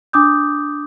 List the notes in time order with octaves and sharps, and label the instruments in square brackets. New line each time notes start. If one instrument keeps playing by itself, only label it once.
[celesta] D4 D6 D#6 G6